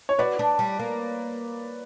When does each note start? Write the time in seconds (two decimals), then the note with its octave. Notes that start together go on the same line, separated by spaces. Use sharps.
0.09 C#5
0.19 F#4 B4 D5
0.39 D4
0.59 G3
0.79 A#3